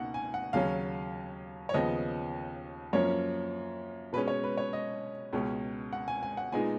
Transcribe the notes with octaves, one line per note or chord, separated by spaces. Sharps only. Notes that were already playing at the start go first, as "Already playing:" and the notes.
Already playing: C#2 B2 A#3 D#4 F#5
G#5
F#5
D#2 C#3 F#3 C#4 F5
C#5
D#2 C#3 F3 B3 D#5
F#2 F3 A#3 C#4 C#5
B2 G#3 C#4 B4
C#5
B4
C#5
D#5
C#2 B2 G#3 C#4
F#5
G#5
G#5
F#5
A#2 G#3 B3 D#4 G#5